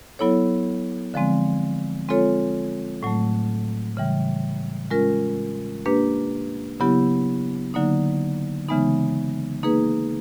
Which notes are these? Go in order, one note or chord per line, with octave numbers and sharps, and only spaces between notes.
F#3 B3 E4 A4 C#5
D3 F3 G#3 C4
G#3 C4 F4 A4 C#5
A2 F#3 A3
C#3 E3 G3
G#3 C#4 F4 A#4
A#3 D4 G4 B4
C#3 F#3 B3 E4 G4
D3 F#3 A#3 D#4
C#3 E3 G#3 B3 D#4
A#3 D#4 G#4 B4